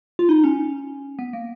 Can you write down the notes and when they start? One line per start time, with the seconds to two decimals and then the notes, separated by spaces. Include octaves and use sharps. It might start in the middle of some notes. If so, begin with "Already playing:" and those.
0.19 F4
0.29 D#4
0.44 C#4
1.19 B3
1.33 A#3